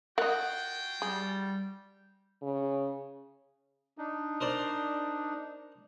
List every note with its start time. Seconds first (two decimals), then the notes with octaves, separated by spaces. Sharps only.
0.18 F4 F#4 A#4 D#5 F#5 G5
1.02 G3 G#4
2.42 C#3
3.98 D4 D#4
4.41 A#4 C5 D5